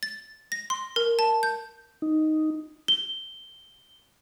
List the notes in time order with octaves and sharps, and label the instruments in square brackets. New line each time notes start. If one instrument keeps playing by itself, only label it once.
[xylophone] A6
A#6
C6
A#4
A5
G6
[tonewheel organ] D#4
[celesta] G7